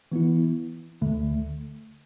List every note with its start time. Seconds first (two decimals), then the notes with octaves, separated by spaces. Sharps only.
0.12 E3 B3 E4
1.01 D2 D3 A3